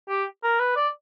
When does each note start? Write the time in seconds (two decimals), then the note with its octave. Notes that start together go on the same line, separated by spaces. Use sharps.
0.09 G4
0.43 A#4
0.59 B4
0.76 D5